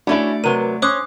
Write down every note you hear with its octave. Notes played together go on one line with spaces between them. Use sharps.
A3 B3 C#4 D4 E4 F#4 D5
C3 F#3 A#4 B4 D#7
C#4 C5 C#5 C6 D6 D#6 F#6